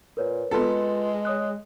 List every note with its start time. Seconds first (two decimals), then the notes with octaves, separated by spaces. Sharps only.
0.17 A#2 A#4 B4 C#5
0.51 G#3 B3 F4 A4 B4 C6
1.25 C#5 D#6 F#6